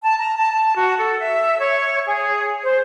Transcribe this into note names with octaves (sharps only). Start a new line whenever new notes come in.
A5
A#5
A5
A5
F#4
A4
E5
C#5
G#4
C5